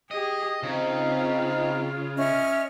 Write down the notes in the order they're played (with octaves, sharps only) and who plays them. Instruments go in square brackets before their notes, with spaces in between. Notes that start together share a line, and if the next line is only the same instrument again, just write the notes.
[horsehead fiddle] G4 G#4 [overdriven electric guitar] D#5
[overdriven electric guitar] C#3 [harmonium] C4 D#4 [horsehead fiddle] F4
[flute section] C#4 E5 F6 [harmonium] D#5